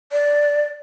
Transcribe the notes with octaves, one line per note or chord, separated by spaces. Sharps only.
D5